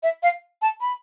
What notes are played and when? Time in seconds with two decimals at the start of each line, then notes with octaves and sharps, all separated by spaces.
0.03 E5
0.23 F5
0.62 A5
0.81 B5